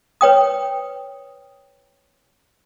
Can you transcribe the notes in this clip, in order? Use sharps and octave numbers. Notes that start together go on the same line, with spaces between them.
B4 C#5 G5 D#6